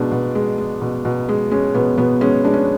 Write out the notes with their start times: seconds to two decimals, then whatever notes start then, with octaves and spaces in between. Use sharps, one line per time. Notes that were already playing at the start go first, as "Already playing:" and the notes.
Already playing: B2 G#3 D4
0.12 B2
0.35 G#3
0.58 G#3
0.82 B2
1.05 B2
1.29 G#3
1.51 G#3 C#4
1.75 B2 B3
1.98 B2 B3
2.21 G#3 C#4
2.44 G#3 D4
2.53 C#4